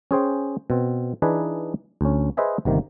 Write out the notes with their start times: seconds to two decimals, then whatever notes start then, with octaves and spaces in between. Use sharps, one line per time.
0.11 C#4 G#4 C5 G5
0.70 B2 C4
1.22 E3 D4 D#4 G#4 B4
2.01 D2 C#4
2.37 G#4 B4 C5 D#5 E5 G#5
2.65 G1 C3 D#3 A#3